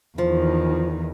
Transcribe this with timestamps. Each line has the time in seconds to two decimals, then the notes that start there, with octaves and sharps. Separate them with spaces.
0.18 E2 D#3 F3